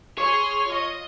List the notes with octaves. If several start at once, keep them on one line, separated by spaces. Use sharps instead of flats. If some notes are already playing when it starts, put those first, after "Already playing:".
G#4 C#5 C6 F6
F4 D#5